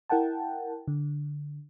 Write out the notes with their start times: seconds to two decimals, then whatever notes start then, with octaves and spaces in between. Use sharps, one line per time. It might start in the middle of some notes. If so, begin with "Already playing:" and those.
0.10 E4 A#4 F#5 G5 A5
0.88 D3